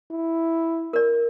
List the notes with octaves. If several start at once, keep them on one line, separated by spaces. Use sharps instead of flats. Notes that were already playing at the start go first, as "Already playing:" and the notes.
E4
A#4 D5